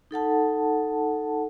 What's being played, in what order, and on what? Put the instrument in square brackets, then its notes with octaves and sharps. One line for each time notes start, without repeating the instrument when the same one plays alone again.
[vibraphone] D#4 A4 F#5 A5